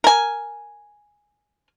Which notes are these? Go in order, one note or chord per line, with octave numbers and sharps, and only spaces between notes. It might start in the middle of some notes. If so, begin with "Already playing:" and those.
A#4 G#5